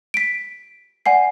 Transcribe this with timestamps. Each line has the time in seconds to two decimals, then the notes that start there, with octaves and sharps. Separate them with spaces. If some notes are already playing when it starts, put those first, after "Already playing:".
0.14 B6 D7
1.06 D5 F#5 G#5 C7